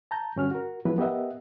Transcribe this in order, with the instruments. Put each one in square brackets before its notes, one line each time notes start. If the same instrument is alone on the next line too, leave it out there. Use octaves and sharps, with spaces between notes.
[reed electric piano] A5 A#5 G6
G2 D3 C#4 F#4 F6
F#4 A#4
F3 F#3 G#3 B3 E4 B4
B3 G4 A#4 D#5 E5 F#5